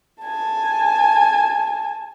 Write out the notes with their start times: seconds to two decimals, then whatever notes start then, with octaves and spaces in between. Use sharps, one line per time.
0.24 G#5 A5